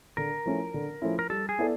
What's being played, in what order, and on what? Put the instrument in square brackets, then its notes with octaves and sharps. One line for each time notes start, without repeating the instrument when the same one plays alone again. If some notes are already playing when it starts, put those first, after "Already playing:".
[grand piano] D3 [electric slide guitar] A#4
[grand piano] F3 A3 C#4 E4
D3
F3 A3 C#4 E4
[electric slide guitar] A#4
[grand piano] G3 [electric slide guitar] A4
[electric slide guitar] G#4
[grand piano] B3 E4 A4 D5